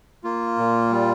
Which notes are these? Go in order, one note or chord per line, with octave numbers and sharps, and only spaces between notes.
A#3 F4
A#2
G3